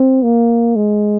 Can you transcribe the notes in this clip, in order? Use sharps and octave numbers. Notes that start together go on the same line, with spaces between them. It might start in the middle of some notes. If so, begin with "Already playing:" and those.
Already playing: C4
A#3
G#3